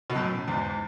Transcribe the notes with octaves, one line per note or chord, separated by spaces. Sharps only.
B2
F#2 A2
E2 G#2